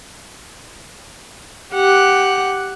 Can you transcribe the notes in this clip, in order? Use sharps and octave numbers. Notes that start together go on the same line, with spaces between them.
G4 F#5